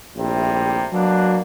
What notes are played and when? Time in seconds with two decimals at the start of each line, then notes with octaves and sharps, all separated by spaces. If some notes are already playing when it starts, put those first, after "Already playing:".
0.16 A#1 A2 C3 G3
0.92 B2 F#3 A#3 D4